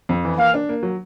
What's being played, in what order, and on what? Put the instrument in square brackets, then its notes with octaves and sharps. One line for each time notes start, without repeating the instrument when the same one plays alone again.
[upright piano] F2
E3
[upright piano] A#3 [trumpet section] F5
[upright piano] D4
A#3
F#3